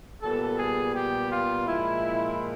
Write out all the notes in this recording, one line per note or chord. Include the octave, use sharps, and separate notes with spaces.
A#2 G3 B3 A4
G#4
G4
F4
A#2 F3 G#3 E4